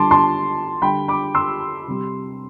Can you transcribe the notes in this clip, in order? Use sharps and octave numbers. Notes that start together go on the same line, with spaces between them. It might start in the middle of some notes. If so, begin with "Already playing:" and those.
Already playing: D3 G3 A5 C6 D6
A5 C6
D3 G3 G5 B5
B5 D6
C6 E6
C3 G3